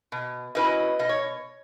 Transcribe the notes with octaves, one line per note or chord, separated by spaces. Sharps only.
B2
F#3 C#4 E4 B4 D#5
B2 D#5
C#5